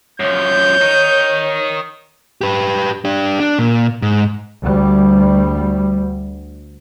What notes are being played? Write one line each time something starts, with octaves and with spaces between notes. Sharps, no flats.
F#2 F3 C#5 G6
D#3 D#4
G4 B4
D4 G4
D4
A#2
G#2
D2 G3